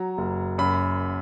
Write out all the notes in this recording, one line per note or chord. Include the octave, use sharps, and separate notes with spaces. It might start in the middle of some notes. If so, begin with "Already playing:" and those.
Already playing: F#3 A#5
F#1
F#2 B5